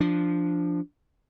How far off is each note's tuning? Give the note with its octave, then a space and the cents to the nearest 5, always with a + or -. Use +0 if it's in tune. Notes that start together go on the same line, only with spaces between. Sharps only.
F3 -10 D4 +0